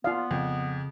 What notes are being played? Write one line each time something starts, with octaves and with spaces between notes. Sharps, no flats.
B3 F4 D5 F5
F2 C#3